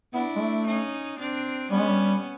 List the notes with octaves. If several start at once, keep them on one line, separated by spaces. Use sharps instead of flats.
B3 D4 E4
G#3
A3
C#4 D#4
C4 D4
G3 B3 C#4
G#3
G3